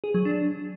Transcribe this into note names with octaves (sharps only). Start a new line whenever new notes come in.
G#4
F#3
D4